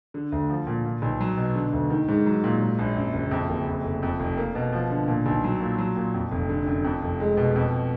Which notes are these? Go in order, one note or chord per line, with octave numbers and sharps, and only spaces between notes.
D3
D2
F3
A#2
A#2
B1
F#3
B2
D3
D2
D#3
G#2
F#3
A#2
G#2
A#1
F#2
F#1
F2
F#1
F2
F1
F2
F1
A#3
B2
F3
D3
A#2
B1
F#3
A#2
F#3
A#2
F2
F1
D3
F#2
F2
F1
G#3
B2
F2